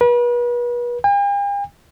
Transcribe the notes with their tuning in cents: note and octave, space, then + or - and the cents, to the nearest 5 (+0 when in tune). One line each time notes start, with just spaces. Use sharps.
B4 -35
G5 +45